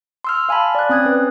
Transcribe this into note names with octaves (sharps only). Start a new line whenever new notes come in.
C6 E6 F6
F5 G#5 A5 B5
D5 F#6
C4 C#4 D#6 F#6 G#6
C#4 B4